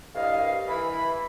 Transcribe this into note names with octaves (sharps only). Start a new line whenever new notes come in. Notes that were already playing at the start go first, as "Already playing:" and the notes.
C2 G2 D#5 F5
E3 B5